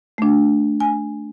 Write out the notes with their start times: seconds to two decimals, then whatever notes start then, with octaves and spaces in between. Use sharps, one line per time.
0.18 A3 D4
0.80 G#5